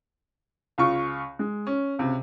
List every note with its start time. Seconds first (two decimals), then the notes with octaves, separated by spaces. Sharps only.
0.78 C#2 F4 C#6
1.39 G#3
1.67 C#4
1.99 C#2 C3